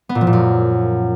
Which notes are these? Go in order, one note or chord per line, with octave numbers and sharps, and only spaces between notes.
B3
A#2
F3
A#2
F#2